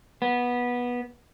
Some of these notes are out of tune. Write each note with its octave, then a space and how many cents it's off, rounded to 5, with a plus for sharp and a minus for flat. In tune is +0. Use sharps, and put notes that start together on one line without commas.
B3 -15